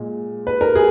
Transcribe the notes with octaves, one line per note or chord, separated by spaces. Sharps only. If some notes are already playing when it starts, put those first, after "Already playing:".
Already playing: A#2 G#3
B4
A#4
G#4